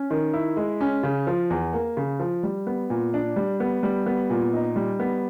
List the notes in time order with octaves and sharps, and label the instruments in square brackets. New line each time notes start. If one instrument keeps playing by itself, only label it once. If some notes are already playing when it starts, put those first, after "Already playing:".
Already playing: [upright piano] C#4
D#3
E4
G#3
C#4
C#3
F3
E2
A#3
C#3
F3
G3
B3
A#2
D4
G3
B3
G3
B3
A#2
D#4
G3
B3